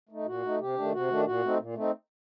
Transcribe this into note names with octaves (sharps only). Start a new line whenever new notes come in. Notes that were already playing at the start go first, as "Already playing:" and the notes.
A3 D#4
A#2 F#4
A3 D#4
C3 G4
D#3 A3 D4
C3 F#4
D#3 A3 D4
A#2 F#4
A3 C4 D#4
A#2
A3 C4 D#4